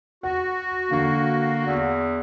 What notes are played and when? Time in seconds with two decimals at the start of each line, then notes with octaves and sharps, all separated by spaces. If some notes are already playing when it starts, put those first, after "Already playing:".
0.23 F#4 F#5
0.91 D3 A#3 C#6
1.66 E2